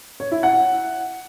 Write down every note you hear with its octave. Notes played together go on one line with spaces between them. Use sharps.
C#5
E4
F#5